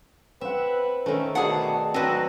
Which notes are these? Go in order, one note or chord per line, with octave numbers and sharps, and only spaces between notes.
C4 B4 E5 F#5
D#3 A3 C#4 A#4 C5
B2 G#4 D5 F#5 A5
F#3 C4 F#4 B4 D#5 A5